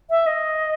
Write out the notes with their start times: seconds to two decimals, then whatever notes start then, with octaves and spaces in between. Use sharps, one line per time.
0.10 E5
0.27 D#5